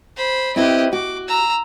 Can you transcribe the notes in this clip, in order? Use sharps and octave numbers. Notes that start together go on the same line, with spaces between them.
C5 B5
C4 E4 G4 B4 D#5
F#4 D6
A#5 E6